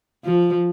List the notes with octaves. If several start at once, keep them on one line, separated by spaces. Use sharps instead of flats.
F3